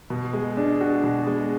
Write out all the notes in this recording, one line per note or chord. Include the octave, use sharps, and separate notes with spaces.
B2
G#3
D4
F#4
B2
G#3